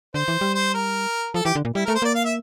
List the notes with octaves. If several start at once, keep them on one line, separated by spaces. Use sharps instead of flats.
D3 C5
E3
G3
C5
A#4
F3 A4
E3 G4
D3
A#2
G3 E4
A3 A#4
C5
A#3 D5
F5
E5